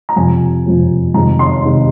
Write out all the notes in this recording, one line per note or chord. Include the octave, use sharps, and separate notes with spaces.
A#5
F2 C3 F3 G#5
F2 C3 F3
F2 C3 D#3 G#3 A#5
C6
C3 D#3 G#3